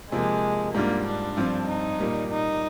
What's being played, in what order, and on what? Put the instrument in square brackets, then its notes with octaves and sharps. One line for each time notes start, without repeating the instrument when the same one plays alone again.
[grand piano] C3 F3 A#3 [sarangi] G#3
[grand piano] G#2 G3 D4 F4 [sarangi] A#3
[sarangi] D4
[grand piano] G2 F3 C4 F4
[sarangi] D#4
[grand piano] A#2 G3 A#3
[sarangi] D#4